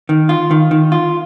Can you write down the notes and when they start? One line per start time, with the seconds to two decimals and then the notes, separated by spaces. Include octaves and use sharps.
0.09 D#3
0.29 F4
0.51 D#3
0.71 D#3
0.92 F4